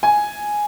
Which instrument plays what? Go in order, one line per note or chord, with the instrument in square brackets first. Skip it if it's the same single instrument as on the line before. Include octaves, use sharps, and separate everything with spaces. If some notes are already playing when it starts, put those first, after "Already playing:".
[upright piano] G#5